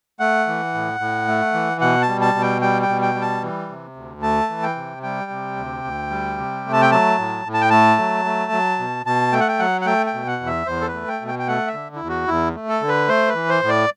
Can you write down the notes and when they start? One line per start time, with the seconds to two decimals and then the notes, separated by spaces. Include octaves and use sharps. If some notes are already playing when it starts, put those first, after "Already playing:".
0.20 A3 F#5
0.47 E3
0.74 A2
1.00 A2
1.28 A3
1.54 E3
1.81 B2 F#5
2.02 A5
2.09 G3
2.21 A5
2.35 B2
2.42 G5
2.61 G3 G5
2.82 G5
2.89 B2
3.02 G5
3.15 G3
3.22 A5
3.43 E3
3.69 C3
3.96 D2
4.22 A3 A5
4.50 E3
4.63 G5
4.76 C3
5.03 G3 G5
5.31 C3
5.56 D2
5.84 D2
6.10 G3
6.38 C3
6.64 A3
6.73 A5
6.82 G5
6.92 F#3 A5
7.18 A2
7.45 A2
7.54 A5
7.61 G5
7.70 A3 A5
7.98 F#3
8.25 A3
8.52 F#3
8.79 B2
9.05 B2 A5
9.32 A3 G5
9.40 F#5
9.48 G5
9.59 F#3 F#5
9.81 F#5
9.86 A3 G5
10.07 G5
10.14 B2
10.27 F#5
10.40 E2
10.46 E5
10.67 E2 C5
10.81 A4
10.88 B4
10.94 A3
11.08 G5
11.21 B2
11.28 G5
11.39 G5
11.48 A3 F#5
11.67 E5
11.74 D3
11.96 E4
12.01 E2
12.08 F#4
12.28 E2 E4
12.55 A3
12.69 A4
12.82 D3
12.88 B4
13.08 A3 C5
13.29 B4
13.35 E3
13.49 C5
13.63 A2
13.69 D5